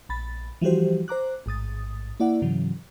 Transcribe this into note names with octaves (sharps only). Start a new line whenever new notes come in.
A#1 B5 A6
E3 F3 G3 F#4 G4 C5
C5 A#5 D6 F#6
A1 G#2 D#6 A6
A#3 E4 D5 F#5
G#2 C#3 E3 F#3